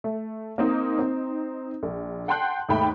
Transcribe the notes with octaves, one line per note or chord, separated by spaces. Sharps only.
A3
A#3 C4 D#4
C4 D#4
A#1
F#5 G5 A5 C6 F#6 G6
D#2 G#2 A3 G5 B5